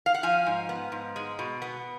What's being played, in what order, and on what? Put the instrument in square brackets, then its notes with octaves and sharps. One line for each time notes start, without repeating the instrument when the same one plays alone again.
[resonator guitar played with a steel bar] F5
F#5
F3 F5 G#5
G#2
B3
G#2
G#3
B2
B3